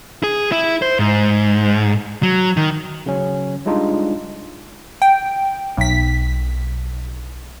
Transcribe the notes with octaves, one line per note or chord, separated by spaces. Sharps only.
G#4
E4
C5
G#2
F#3
D#3
C#3 F#3 C#4
G3 G#3 D4 D#4 F4
G5
B1 B6